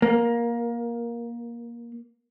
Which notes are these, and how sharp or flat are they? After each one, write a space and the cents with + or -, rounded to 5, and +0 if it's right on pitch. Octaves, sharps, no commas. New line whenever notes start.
A#3 +15